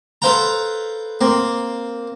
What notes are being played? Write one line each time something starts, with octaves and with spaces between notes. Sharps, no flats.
A4 B4 C5 F5 G5 A#5
A#3 C4